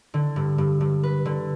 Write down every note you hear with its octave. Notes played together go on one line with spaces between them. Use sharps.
D3
G2
G2
G2
B4
D3